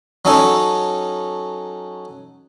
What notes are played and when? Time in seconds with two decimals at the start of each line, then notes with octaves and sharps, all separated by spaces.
0.25 F#3 C#4 D#4 A4 C#5